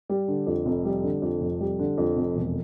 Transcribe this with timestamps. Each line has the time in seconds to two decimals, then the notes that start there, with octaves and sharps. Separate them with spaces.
0.09 G3
0.28 D3
0.47 F2
0.66 F1
0.85 G3
1.04 D3
1.22 F2
1.41 F1
1.61 G3
1.79 D3
1.98 F2
2.17 F1
2.36 E1